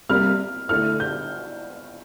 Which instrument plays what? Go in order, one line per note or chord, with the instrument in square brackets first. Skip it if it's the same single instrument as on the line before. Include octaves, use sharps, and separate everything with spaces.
[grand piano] C3 G3 A#3 [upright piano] F6
[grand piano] D3 A3 E4 A4 [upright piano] F6
[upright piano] G6